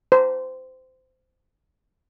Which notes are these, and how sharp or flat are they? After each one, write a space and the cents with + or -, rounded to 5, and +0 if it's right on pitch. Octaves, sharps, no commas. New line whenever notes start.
C5 -20